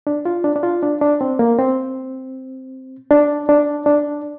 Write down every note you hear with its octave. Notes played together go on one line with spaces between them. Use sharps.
D4
F4
D4
D4
F4
D4
D4
C4
A#3
C4
D4
D4
D4